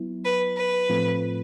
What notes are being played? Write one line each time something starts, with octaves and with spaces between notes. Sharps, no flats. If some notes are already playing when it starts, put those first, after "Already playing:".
Already playing: F#3 B3 E4
B4
B4
A2 F3 A3 C4 F4